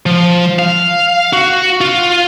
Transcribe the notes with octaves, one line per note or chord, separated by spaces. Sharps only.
F3
F5
F#4
F4